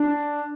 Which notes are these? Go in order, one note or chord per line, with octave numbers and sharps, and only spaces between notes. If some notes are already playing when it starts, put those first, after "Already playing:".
Already playing: D4